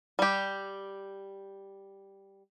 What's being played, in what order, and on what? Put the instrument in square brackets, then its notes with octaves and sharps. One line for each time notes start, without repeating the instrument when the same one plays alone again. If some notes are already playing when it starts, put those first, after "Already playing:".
[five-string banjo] G3 G4